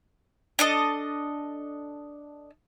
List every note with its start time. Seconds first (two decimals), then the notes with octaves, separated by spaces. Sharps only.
0.59 D4 A4 D#5